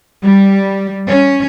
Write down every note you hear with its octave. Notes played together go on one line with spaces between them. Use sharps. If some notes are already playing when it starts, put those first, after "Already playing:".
G3
C#4